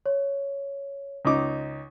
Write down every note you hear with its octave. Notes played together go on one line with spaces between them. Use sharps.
C#5
C#2 D#4 D6